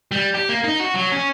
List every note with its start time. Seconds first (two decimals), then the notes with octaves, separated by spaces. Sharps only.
0.12 G3
0.35 G4
0.49 A#3
0.64 D#4
0.80 F#4
0.95 F#3
1.12 C#4